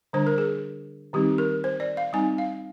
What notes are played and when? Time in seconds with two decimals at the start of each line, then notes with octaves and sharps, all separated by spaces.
0.13 D3 G3 D4 C5
0.27 A#4
0.38 G#4
1.13 D#3 G3 C4 D#4 G4
1.38 A#4
1.64 C5
1.80 D5
1.97 F5
2.13 G3 C4 D#4 G#5
2.38 F5